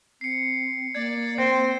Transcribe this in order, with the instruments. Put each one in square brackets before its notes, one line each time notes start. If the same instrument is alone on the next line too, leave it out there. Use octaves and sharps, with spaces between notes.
[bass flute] C4 [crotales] C7 C#7
[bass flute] A#3 [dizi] D5 [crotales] G#6
[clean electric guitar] C4 [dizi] C5